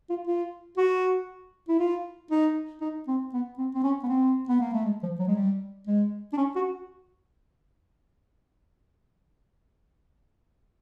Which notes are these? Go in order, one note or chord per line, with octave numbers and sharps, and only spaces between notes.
F4
F4
F#4
E4
F4
D#4
D#4
C4
B3
C4
C4
C#4
B3
C4
B3
A#3
A3
G#3
F3
F#3
G#3
G3
G#3
D4
C#4
F#4